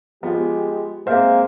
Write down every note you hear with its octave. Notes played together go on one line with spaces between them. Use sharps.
F3 G#3 B3 G4
G#3 A#3 C4 C5 E5 F5